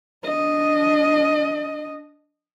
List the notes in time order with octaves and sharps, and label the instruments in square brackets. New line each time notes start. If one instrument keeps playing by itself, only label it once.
[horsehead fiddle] D4 D#5